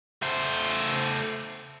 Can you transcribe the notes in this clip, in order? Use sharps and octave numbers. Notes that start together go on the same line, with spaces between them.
A3 C5